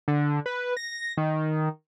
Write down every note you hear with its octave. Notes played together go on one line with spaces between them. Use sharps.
D3
B4
A#6
D#3